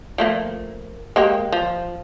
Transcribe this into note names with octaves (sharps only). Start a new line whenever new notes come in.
F3 A3 A#3
G#3 A#3 G4
F3